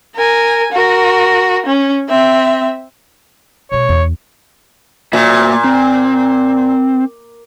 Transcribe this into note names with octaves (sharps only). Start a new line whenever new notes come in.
A#4 G#5
F#4 A#4
C#4
C4 E5
B2 G#3 C#5
E2
A#2 A#3 F#4 E5
C4